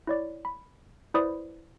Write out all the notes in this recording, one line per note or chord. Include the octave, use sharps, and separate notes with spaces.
E4 C#5 D5
B5
E4 B4 C5 D5 B5 D#6